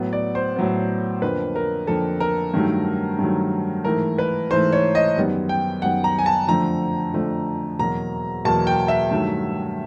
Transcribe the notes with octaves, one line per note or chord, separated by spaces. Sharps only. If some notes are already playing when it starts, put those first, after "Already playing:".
Already playing: A2 F#3 B3
D5
C5
A2 F#3 B3
F2 D3 F3 A#3 B4
A#4
F2 D3 F3 A#3 A4
A#4
G2 D#3 F#3 A3
G2 D#3 F#3 A3
G#2 E3 A3 A#4
B4
G#2 E3 A3 C5
C#5
D#5
F#2 D#3 G3 B3
G5
F#2 D#3 G3 B3 F#5
A#5
G#5
A5
F2 D3 F3 A3 A#5
F2 D3 F3 A3
E2 B2 F#3 A#3 A#5
E2 B2 F#3 A#3 A5
G5
E5
G2 D#3 F#3 A3